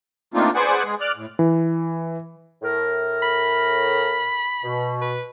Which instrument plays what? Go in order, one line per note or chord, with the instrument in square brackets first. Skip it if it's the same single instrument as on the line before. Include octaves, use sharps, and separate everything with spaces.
[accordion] A3 A#3 C4 D4 D#4 F4
G#4 B4 C5 D5 F#5 G#5
G#3 G#4
D5 F6 F#6
A2
[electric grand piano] E3
[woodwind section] A2 A#4
[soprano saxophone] B5
[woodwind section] B2
[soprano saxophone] B4